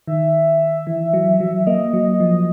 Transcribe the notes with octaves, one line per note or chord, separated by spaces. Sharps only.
D#3 E5
E3
F#3
F#3
A#3 D#5
F#3
F3